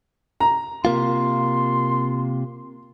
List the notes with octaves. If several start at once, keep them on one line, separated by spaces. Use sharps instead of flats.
A#5
C3 A#3 F4 C6